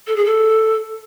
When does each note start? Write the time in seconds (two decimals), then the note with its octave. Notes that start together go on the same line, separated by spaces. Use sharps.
0.07 A4
0.16 G#4
0.25 A4